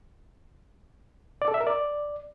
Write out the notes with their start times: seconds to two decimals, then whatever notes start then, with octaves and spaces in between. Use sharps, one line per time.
1.42 D5
1.48 A4
1.54 E5
1.60 A#4
1.67 D5